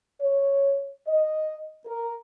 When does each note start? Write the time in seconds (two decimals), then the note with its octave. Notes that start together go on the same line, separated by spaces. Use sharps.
0.21 C#5
1.08 D#5
1.86 A#4